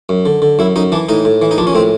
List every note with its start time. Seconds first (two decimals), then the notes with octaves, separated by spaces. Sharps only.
0.09 F#2
0.26 D3
0.42 D3
0.59 F#2 E4
0.76 F#2 D#4
0.92 E3 D4
1.09 A2 D#4
1.25 A2
1.42 E3
1.51 D#4
1.58 A#1 D4
1.67 C#4
1.75 A2 C4